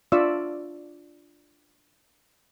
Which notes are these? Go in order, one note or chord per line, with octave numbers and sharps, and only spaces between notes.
D4 F4 D5 E5 C#6 E6